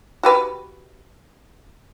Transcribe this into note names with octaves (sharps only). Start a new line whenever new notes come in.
F#4 G4 B4